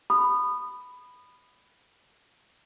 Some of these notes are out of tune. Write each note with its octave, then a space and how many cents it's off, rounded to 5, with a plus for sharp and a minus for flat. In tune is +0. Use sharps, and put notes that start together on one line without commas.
B5 +10 D#6 -20